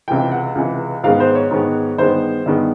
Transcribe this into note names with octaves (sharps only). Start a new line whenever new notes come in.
C#2 C3 E3 G5
F#5
C#2 C3 E3
G#2 D#3 G#3 B3 F5
C5
C#5
G#2 D#3 G#3 B3
G2 D#3 G#3 B3 C5
G2 D#3 G#3 B3